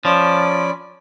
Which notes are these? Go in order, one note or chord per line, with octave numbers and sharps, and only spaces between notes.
F3 C#4 D5 B5